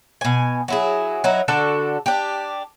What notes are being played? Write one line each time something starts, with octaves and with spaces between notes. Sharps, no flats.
B2 G#5
F#3 E4 G#4
F#3 D#4 E4
D3 D4 F#4 A4
D4 G4